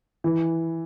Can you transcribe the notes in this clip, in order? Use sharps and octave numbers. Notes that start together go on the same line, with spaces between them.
E3